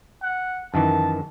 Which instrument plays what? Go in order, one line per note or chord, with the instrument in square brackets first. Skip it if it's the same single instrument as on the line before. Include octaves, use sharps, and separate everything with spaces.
[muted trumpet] F#5
[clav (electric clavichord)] F#2 D#3 E3 [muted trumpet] A5